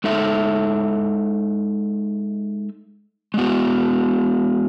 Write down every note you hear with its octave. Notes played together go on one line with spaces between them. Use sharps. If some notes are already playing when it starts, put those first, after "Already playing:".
G#3 D#4 A4 E5
G#3 B3 F#4